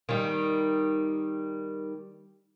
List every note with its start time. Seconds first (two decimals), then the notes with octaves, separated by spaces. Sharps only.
0.09 D#3 G3